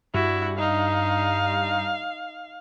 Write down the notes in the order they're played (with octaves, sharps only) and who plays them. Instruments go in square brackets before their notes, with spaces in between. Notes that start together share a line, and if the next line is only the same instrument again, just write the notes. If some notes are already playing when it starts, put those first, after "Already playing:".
[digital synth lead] G2 [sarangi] E4 [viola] F#4
[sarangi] D#4 [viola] F5